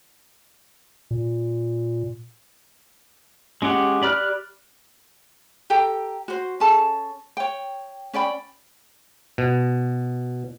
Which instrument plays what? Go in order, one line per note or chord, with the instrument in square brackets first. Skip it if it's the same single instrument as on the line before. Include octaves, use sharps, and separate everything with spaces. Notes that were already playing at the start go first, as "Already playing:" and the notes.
[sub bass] A#2
[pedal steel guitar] G#3 C#4 G4 F#5
G4 D5 B5 F6 F#6
[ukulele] G4 A4 G5 A#5
F#4 C5
C#4 G#4 A4 A5
C#5 G5
C#4 D5 G5 B5
[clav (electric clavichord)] B2